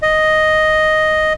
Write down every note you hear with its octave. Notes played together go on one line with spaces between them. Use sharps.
D#5